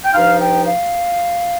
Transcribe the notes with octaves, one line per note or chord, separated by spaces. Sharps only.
G5
G2 F3 D#4 F5
G5
F5